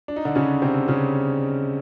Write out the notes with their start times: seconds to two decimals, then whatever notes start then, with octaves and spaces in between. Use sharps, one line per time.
0.08 D4
0.16 D#4
0.25 D3 D4
0.35 C#3 C#4
0.62 C3 C4
0.88 C#3 C#4